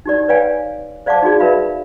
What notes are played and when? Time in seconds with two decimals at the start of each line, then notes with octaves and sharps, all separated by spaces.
0.06 D#4 G4 D5
0.28 B4 C#5 D5 F5 G5 G#5
1.06 C5 D5 F5 F#5 A5 D6
1.22 D#4 F#4 G#4 D5
1.40 A#4 B4 E5 F5 B5